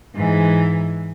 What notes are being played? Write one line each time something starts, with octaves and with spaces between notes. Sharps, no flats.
G#2 E3